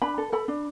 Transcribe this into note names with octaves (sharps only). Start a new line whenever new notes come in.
D4 B5
A4
A4 B5
D4